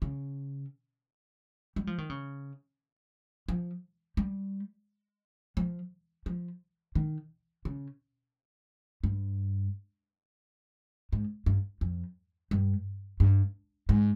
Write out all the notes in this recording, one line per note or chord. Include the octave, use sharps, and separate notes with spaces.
C#3
G3
F3
D#3
C#3
F3
G3
F3
F3
D#3
C#3
G2
G#2
G2
F2
G2
G2
G#2